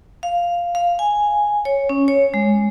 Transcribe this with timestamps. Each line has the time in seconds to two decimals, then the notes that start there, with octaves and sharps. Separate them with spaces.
0.23 F5
0.75 F5
0.99 G#5
1.65 C#5
1.89 C#4
2.08 C#5
2.34 G#3